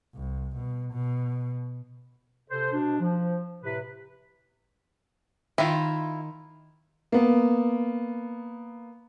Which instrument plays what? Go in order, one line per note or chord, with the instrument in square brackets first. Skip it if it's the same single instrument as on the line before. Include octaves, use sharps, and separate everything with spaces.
[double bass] C2
B2
B2
[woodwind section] C3 A4 C5
B2 D4
F3
A2 C3 B4
[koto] D#3 [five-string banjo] E4 F4
[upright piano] A#3 B3